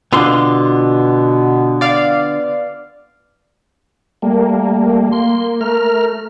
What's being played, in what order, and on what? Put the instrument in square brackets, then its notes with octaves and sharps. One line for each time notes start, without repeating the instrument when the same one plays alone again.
[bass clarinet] B2 [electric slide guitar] D3 [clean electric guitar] B3 F4 C6
[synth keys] D5 F5
[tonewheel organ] G3 A3 [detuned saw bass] A#3
[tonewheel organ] C6
[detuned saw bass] A3 [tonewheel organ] A#4 F6